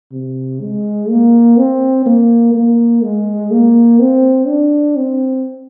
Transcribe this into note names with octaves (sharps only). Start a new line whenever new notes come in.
C3
G#3
A#3
C4
A#3
A#3
G#3
A#3
C4
D4
C4